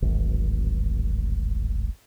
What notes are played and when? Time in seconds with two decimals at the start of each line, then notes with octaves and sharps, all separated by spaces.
0.02 D1 G#1